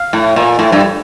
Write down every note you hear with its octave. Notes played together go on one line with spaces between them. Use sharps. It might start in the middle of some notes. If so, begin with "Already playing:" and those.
Already playing: F5
A2
A#2
A2
G2